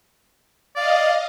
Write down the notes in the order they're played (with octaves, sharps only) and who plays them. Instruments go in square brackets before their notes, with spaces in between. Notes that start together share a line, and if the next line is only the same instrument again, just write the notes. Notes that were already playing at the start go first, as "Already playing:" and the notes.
[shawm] D5 [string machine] D#5 F5